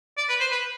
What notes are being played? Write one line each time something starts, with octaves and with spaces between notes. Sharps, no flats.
D5
B4
C5
B4